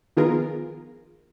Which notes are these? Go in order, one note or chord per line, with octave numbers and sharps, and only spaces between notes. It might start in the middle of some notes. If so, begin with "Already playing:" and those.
D#3 F3 B3 F4 G#4 A#4